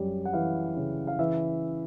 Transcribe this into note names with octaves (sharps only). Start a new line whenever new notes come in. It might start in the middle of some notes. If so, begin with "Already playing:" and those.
Already playing: F#2 G3
F#5
E3 F5
C#3
F5
E3 E5